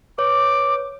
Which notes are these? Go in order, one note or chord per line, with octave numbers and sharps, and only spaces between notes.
B4 C#5 D6